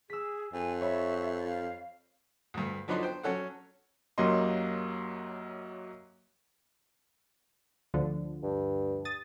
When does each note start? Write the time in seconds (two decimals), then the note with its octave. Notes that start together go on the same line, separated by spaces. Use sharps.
0.10 G#4 E6 B6
0.53 F2 G#5
0.81 C#5 E5 B5 C#6
1.47 F5
2.54 D2 G2
2.88 F3 F#3 B3 D4 D#4 C6
3.03 C5 G5
3.23 F#3 C#4 A4 F#5
4.18 F#2 F#3 A#3 G4 D#5 C6
7.94 D2 D3 F3
8.43 G2
9.05 D#6 A6